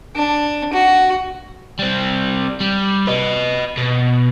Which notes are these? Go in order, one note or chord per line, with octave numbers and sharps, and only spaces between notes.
D4
F#4
G3 C4
G3
B4 D#5
B2